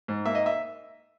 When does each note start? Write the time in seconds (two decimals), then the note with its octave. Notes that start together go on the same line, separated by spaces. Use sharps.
0.08 G#2
0.26 A#3 E5
0.35 D#5
0.46 E5